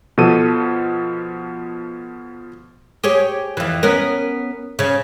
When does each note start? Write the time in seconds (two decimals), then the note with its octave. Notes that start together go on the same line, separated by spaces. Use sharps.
0.18 B2 F3 A4 D#7
3.04 G4 G#4 C#5
3.57 F2 E3
3.83 B3 C#4 A#4
4.79 C#3 C#4